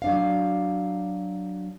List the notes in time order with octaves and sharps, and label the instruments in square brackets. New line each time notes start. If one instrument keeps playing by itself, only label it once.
[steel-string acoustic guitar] F#3 D4 F5